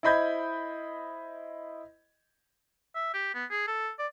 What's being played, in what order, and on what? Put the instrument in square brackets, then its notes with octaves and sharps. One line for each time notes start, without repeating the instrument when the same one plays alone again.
[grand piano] E4 C5 D#5 B5 G6 G#6
[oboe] E5
G4
B3
G#4
A4
D5